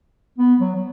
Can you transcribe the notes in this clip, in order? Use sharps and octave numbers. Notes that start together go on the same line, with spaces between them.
B3
F#3
F#3